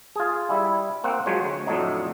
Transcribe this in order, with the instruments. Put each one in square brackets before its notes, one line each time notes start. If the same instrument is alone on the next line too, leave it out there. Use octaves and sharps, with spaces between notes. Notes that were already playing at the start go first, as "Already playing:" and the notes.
[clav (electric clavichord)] F4 G#4
G3 E4
A#3 C4 F#5
F3 F#3 G#3 C5 C#5
D2
F2 A2 F#3 D4 D#4